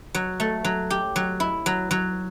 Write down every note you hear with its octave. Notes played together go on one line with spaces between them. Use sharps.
F#3
A3
F#3
G4
F#3
E4
F#3
F#3